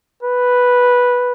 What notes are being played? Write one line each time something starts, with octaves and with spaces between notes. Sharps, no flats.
B4